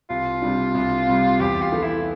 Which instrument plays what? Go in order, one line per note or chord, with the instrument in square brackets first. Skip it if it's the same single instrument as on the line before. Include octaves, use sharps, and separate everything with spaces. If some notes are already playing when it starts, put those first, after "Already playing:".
[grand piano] C2 [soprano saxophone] F4
[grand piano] C3 G3 D4
C2
C3 G3
[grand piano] E2 [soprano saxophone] G4
[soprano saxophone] F4
[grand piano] E3 A3
[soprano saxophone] E4